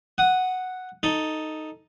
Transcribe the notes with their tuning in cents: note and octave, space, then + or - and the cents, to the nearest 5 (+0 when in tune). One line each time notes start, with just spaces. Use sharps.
F#5 +0 D#6 +0
D#4 +0 A4 +0